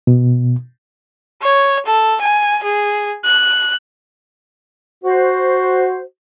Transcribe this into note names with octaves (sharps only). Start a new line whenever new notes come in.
B2
C#5
A4
G#5
G#4
F#6
F#4 C5